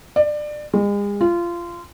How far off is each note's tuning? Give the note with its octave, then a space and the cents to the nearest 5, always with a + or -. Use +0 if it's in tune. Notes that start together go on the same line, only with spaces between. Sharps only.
D5 +25
G#3 -40
F4 -20